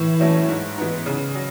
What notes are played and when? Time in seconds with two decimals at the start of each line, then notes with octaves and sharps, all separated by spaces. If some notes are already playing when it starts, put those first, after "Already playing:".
Already playing: A2 E3
0.20 F#3 A3 C#4 E4
0.49 G#2
0.78 E3 B3 D#4
1.06 C#3
1.35 F#3